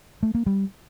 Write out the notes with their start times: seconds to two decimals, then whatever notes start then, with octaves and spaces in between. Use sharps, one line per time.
0.23 A3
0.35 A#3
0.46 G3